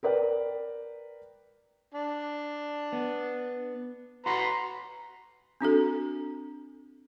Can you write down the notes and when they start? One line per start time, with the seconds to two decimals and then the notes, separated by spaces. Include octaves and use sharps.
0.03 A#4 B4 D5 G5
1.94 D4
2.93 B3
4.26 F#4 B4 A#5 C6
5.61 C4 D4 F#4 A4